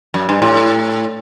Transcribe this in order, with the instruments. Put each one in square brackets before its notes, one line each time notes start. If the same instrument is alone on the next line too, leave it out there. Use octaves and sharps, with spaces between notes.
[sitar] F#2
G2
A2